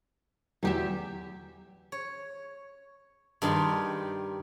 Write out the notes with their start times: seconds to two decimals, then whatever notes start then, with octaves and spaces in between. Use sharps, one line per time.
0.63 E2 E3 F#3 G4 E5
1.92 C#5
3.42 G2 D#3 G3 D#4 C6